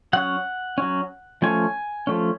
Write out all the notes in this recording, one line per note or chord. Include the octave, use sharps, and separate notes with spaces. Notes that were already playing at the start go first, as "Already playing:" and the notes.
F#3 C#4 F#5
F#3 C#4
F3 A3 C#4 G#5
F3 A3 C#4